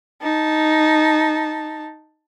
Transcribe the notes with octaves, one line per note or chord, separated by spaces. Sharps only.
D#4 A5